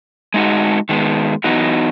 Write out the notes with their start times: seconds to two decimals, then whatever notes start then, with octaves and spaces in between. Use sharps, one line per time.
0.34 G#3 D#4 F#4
0.89 D#3 G#3 B3
1.44 E3 B3 D#4 F#4